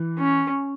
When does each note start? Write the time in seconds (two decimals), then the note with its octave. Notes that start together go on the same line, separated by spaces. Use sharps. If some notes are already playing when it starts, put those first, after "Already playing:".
Already playing: E3
0.19 C#4